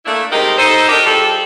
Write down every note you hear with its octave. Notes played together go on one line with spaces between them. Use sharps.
A3 A#3 D4 E4
C3 G3 G#3 D#4 G4 A#4
D#4 A4 C5
D4 D#4 F#4 G4 A#4
F3 G3 G#4 A4